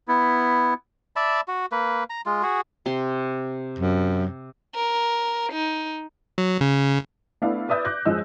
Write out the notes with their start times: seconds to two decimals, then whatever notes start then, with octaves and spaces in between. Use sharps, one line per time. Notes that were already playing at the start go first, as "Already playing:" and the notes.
0.08 B3 E4
1.16 D5 E5 A5 B5
1.48 F#4
1.72 A#3 B4
2.10 A#5
2.26 G#3 F4
2.43 F#4 G#4
2.86 C3 C6
3.79 F#2
4.75 A#4
5.52 D#4
6.38 F#3
6.61 C#3
7.42 A3 B3 D4 E4 F5
7.69 B4 D5 E5 D#6 G6
7.85 D6 F#6 G6 A#6
8.05 F#2 F3 G#3 D#5 E6